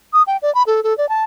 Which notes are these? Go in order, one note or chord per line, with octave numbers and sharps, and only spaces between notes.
D#6
G5
D5
B5
A4
A4
D5
A5